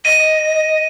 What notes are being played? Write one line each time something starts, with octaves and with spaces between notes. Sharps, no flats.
D#5 D#7